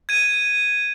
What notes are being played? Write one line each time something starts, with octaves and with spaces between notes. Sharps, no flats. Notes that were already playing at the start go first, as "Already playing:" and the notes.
G#6 D#7